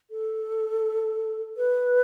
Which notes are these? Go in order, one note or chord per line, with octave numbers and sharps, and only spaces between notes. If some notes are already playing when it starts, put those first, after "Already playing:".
A4
B4